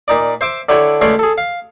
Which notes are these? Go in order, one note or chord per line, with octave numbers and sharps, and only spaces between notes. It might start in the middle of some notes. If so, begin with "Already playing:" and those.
A#2 D#4 D5
C5 E5 D6
D3 D4 E4 C#5 G5 B5
C#2 A3 C#5 D5 B5 C6
G#4 A4
F5